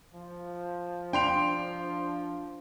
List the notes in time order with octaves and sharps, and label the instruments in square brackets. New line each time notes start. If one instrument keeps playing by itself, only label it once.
[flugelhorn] F3
[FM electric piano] D4 [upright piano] G5 C6 F7